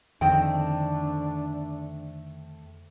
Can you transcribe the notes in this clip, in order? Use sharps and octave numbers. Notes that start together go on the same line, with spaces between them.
F2 D3 D#3 A3 C4 D4 G5